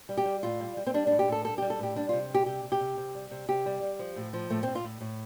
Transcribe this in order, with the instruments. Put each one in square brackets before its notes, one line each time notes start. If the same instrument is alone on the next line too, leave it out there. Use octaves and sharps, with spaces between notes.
[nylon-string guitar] G3
G4
G3
A2 F4
G3
G3
C4
G3 D4
D4
A2
G4
A2 A4
G3 A4
G4
G3
A4
A2 G4
G3 D4
C3 F4
G3 G4
C3 G4
C3
G4
C3
C3
G3
C3
C3 G4
G3
G3
F3
A2
F3
A2 A3
C4
A2
F4
A2
A2